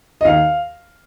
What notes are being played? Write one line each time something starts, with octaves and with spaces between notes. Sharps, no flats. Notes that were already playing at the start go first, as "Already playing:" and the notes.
D#5
D#2 F5